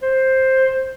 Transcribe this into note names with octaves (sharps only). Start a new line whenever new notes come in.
C5